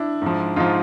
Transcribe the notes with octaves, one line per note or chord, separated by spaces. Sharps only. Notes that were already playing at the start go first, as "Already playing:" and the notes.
Already playing: D4 E4
G#2 F3
G#2 F3 D#4 F4